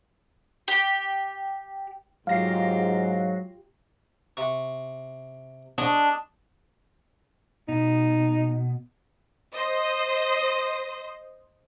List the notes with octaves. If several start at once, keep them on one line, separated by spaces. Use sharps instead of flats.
G4
G#2 F#3 F4 G4 F5 A#6 C7
C3 C#6
G#3 D4 D#5 C#6
B2 D#4
C5 D#5